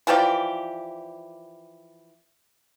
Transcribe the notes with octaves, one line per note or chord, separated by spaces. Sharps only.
E3 F3 G4 D5